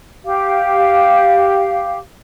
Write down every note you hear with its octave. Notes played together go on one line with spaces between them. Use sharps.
G4 F5